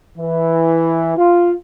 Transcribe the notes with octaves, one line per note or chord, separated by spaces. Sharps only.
E3
F4